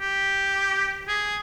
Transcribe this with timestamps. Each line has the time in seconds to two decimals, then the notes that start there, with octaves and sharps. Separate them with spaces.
0.01 G4
1.08 G#4